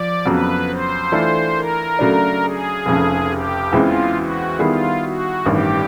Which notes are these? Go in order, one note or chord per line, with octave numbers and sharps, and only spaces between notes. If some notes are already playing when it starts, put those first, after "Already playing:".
Already playing: F3 D5
F2 C#3 F#3 B3 B4
C5
E3 A3 D4 F4 A4
A#4
C#3 F#3 A3 D4
G#4
F1 F2 C#3
G4
E2 C#3 E3 G#3 C4 F4
F#4
D#3 G3 B3 E4 F4 G#4
F#4
A1 G2 D#3 G4